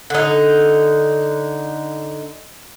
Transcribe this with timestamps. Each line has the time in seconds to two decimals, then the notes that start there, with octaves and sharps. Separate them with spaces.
0.10 D3 D#4